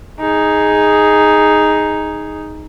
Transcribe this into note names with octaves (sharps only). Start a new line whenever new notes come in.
D#4 G#4